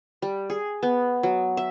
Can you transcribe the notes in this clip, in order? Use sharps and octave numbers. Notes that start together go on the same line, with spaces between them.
G3
G#4
B3
F#3
E5